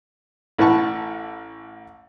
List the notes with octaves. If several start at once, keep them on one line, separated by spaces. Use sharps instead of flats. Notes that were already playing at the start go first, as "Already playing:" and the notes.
A1 A2 B4 F#5 A5 C#6